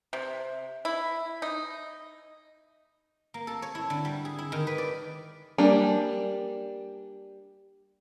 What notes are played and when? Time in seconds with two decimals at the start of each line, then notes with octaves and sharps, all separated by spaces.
0.13 C3
0.85 E4
1.42 D#4
3.34 A#3
3.47 A4
3.62 C#5
3.75 E4
3.90 D3
4.05 G3
4.25 G#4
4.39 E4
4.52 D#3
4.67 B4
4.78 D5
5.58 G3 A#3 D4 G#5